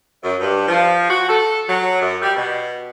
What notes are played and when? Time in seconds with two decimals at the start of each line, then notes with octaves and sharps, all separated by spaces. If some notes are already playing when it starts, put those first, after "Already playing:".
0.23 F#2
0.41 G2
0.68 F3
1.10 F#4
1.28 A4
1.69 F#3
2.01 F#2
2.22 G3
2.37 B2